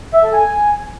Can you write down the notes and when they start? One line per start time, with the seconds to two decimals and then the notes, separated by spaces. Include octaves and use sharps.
0.13 E5
0.23 A4
0.33 G#5